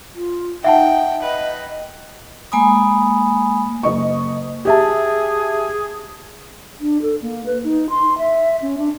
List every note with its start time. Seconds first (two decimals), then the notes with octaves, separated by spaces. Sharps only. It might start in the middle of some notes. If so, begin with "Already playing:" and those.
0.15 F4
0.64 D#4 E5 F#5 G5 A5
1.23 B4 D#5
2.52 G#3 A#3 G#5 B5 D#6
3.83 F#1 D#5 C#6
4.65 G4 G#4 E5 A5
6.81 D4
7.02 A4
7.22 A#3
7.46 B4
7.63 D#4
7.89 C6
8.18 E5
8.62 C#4
8.78 D4